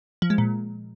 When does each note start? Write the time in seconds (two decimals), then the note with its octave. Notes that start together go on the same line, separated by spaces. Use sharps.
0.22 F3
0.30 G#3
0.38 A#2